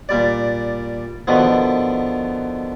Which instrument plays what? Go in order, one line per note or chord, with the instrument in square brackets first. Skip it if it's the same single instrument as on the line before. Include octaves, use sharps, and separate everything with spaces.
[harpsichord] A#2 G3 D5
B2 D3 D#3 F3 B3